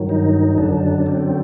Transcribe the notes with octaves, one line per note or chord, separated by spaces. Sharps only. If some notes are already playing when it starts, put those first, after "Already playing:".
Already playing: G2 D#3 F#3
D#4
F#2 D3 F#3 D4
C4